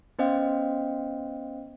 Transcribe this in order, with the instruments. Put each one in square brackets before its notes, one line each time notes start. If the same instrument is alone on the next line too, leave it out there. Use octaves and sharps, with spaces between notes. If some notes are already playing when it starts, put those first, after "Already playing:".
[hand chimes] B3 C#4 C5 D#5 F5 G5